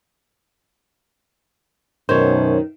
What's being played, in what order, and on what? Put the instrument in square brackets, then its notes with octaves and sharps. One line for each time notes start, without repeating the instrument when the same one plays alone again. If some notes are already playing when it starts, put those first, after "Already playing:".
[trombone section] F#2 B2 [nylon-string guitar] D#3 [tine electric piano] C5 C#5